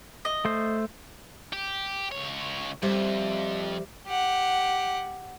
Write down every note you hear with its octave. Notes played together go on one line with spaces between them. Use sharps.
D#5
A3 C5
G4
C#2 C#5
F2 G3 C5 E5
G4 F#5